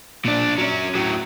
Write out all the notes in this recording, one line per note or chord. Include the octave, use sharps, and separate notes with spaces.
A#2 D4
F#3 C#4
A2 F#3